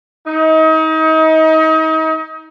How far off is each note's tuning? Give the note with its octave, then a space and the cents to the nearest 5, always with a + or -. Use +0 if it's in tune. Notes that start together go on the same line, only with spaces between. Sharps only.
D#4 +35